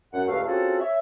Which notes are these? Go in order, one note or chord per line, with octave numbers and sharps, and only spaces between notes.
F#2 F#5
C#2 G2 A3 B4 F5
C4 C#4 F4 F#4 G#4 A4
C#5 E5